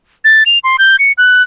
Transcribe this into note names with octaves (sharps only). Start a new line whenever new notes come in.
A6
F7
C6
G6
C#7
F#6